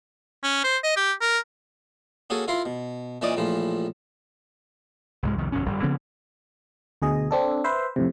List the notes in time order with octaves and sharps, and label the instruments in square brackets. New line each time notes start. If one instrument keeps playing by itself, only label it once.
[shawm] C#4
C5
D#5
G4
A#4
[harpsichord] A#3 C#4 F#4 G#4 A4
E4 F4 A#4 F5 C6
B2
A#2 E3 C#4 D5 D#5 D6
A#1 A2 E3 F4
[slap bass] C2 G#2 G#3
C2 F2 D#3
G1 F2 B2 C#4
G1 G2 G3
C#3 F3 B3 C4
[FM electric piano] D2 B2 G#4 D#5
C4 D4 A4
B4 C5 E5
F2 A2 C3